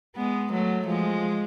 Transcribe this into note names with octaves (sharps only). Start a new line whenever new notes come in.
G#3 B3
F#3 A3
F3 G#3